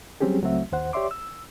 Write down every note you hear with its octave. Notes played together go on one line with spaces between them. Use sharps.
F#3 G3 C4 C#4 G4 G#4
C#2 F#3 A3 C4 F#4 E5
D#2 C5 F#5
G4 C#5 D5 E5 C6 D6
E6